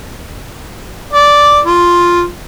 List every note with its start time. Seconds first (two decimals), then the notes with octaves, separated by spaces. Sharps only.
1.13 D5
1.66 F4